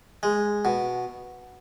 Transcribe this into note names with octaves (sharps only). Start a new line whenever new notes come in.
G#3
B2